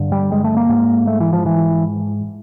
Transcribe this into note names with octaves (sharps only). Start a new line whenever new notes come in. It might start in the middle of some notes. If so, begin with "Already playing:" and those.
Already playing: G2 D3
G3
G#3
A3
A#3
G#2
A3
E3
F3
E3